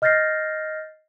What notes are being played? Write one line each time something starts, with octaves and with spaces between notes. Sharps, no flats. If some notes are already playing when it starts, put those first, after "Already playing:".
D#5 F6 G6 A6 A#6 C7